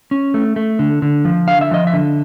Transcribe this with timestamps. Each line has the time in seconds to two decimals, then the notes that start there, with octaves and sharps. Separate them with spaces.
0.11 C#4
0.34 A3
0.56 A3
0.79 D3
1.02 D3
1.25 F3
1.48 D3 F5
1.61 E5
1.71 F3 D#5
1.87 E5
1.93 D3